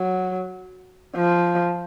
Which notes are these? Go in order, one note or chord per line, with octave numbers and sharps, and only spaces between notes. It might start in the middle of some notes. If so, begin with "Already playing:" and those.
Already playing: F#3
F3